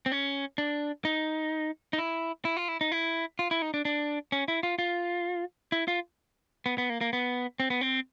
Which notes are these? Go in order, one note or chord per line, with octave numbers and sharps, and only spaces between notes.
C4
C#4
D4
D#4
D#4
E4
E4
F4
E4
D#4
E4
F4
E4
D#4
D4
D4
C#4
E4
F4
F4
E4
F4
B3
B3
A#3
A#3
B3
C4
B3
C4